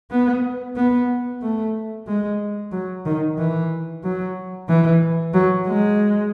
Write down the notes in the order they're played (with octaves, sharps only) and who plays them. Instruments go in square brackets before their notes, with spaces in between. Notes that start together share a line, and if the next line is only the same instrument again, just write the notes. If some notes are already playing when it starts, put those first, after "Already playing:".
[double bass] B3
B3
A3
G#3
F#3
D#3
E3
F#3
E3
F#3
G#3